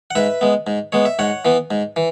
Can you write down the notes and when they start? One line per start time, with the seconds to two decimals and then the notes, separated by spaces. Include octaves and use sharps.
0.11 F#5
0.15 G#2 B4 E5
0.41 G#3 B3
0.67 G#2
0.92 G#3 B3 C#5
1.05 E5
1.19 G#2 C#5 F#5
1.45 E3 B3
1.71 G#2
1.96 E3